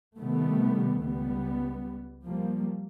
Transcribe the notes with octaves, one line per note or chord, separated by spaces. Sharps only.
C3 D#3 G3 A3 B3
C#2 G3 B3
F3 G3 A#3